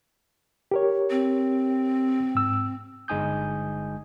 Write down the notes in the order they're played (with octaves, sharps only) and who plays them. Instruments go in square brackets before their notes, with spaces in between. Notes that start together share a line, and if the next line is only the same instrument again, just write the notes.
[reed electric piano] G4 A#4 C#5
[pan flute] C4
[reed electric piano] G#2 E6
[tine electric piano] G1 G#3 D#4 G#5 D#6 G6